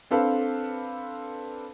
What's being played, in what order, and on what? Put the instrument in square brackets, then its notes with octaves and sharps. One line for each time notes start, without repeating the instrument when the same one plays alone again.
[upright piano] C4 D4 A4 B4 F5